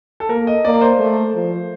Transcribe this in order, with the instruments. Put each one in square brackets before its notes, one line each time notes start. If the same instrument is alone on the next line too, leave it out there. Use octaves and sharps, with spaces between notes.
[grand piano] A4
[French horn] A#3 [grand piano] A#4
[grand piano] D#5
[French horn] A#3 [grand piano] D5
[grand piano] C5
[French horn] A3
F3